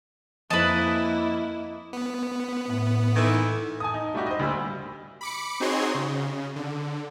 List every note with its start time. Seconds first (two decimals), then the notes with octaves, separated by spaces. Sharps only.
0.50 F2 A#3 E4 B4 D#5 G#5 A5
1.93 B3
2.66 A2
3.15 D#3 E3 A3
3.80 G#5 A5 D#6
3.94 D#4
4.14 G3 A3 D4 D#4 F#4 G4
4.26 C5 D#5
4.39 D2 G3 A#3 B5 E6
5.21 B5 D6 C#7
5.60 C4 D#4 F#4 G#4 C#5 C6
5.95 C#3
6.56 D3